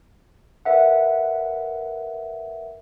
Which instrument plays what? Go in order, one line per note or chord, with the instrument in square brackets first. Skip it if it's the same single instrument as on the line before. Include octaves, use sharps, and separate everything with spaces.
[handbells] A#4 B4 E5 F#5